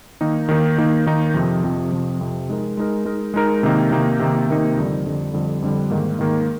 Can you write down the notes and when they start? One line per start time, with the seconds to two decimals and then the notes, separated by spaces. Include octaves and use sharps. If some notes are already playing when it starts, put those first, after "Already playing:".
0.21 D#3 A#3 D#4
0.49 D#3 A#3 D#4
0.78 D#3 A#3 D#4
1.06 D#3 A#3 D#4
1.34 F2 C3 F3
1.64 F2 C3 F3
1.92 F2 C3 F3
2.21 F2 C3 F3
2.49 G#3 D#4 A#4
2.77 G#3 D#4 A#4
3.05 G#3 D#4 A#4
3.34 G#3 D#4 A#4
3.63 C3 D#3 A#3 D#4
3.91 C3 D#3 A#3 D#4
4.19 C3 D#3 A#3 D#4
4.48 C3 D#3 A#3 D#4
4.77 F2 D3 G3
5.06 F2 D3 G3
5.34 F2 D3 G3
5.62 F2 D3 G3
5.90 G#2 D#3 A#3
6.19 G#2 D#3 A#3